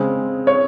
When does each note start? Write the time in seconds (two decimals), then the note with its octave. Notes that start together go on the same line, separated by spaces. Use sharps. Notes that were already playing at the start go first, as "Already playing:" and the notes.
Already playing: C#3 G#3 C4
0.47 C#5